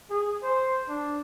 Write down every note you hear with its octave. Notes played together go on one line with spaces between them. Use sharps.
G#4
C5
D4